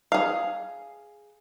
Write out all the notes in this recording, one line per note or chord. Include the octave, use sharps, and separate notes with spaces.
G#4 F5